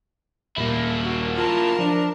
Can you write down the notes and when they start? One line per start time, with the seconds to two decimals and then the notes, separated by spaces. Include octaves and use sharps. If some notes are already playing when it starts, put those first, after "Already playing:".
0.57 D#2 A#2 G3 A#3 E4
1.04 F#4
1.37 F4 A#4 A5
1.79 F3 D4